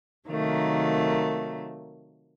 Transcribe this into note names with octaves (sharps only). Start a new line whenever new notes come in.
C3 D#3 F#3 A3 A#3